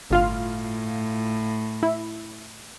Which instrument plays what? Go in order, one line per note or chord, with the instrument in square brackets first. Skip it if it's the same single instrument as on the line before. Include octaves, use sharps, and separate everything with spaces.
[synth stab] G1 F4 F5 [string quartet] A2
[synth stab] E4